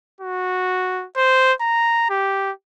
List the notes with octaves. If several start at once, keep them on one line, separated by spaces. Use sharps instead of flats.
F#4
C5
A#5
G4